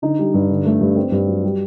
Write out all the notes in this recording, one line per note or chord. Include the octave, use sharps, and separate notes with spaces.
D3 D#4
G3
G2
D3
A3
G2
C4
G2
F#3
G3